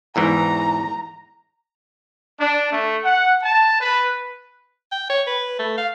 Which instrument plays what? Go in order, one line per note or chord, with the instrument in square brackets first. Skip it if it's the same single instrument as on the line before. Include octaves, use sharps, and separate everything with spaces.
[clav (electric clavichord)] E2 G#2 E3 [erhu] A#5
[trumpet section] D4
A3
F#5
A5
B4
[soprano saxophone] G5
C#5
B4
A3
F5